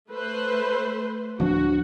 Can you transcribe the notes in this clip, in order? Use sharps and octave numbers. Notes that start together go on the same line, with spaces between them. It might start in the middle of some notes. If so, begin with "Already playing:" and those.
A3 B4 C5
D1 F3 D4 F#4